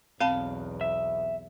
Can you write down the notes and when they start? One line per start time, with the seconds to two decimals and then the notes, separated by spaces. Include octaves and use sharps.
0.20 B1 E2 C4 F5 A5 B5
0.81 E5